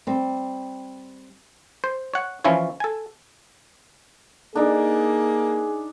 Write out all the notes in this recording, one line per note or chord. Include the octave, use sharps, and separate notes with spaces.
G3 C4
C5
C#5 F#5
E3 F3 C#4 E4 F4 C#5
A4 G#5
A#3 D4 D#4 G#4